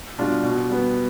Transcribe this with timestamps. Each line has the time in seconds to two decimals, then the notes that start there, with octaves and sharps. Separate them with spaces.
0.19 B2 G3 D4 F4
0.44 B2
0.69 G3 B3